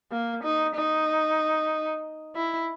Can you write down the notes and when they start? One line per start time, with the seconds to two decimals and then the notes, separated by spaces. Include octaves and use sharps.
0.12 A#3
0.44 D#4
0.76 D#4
2.36 E4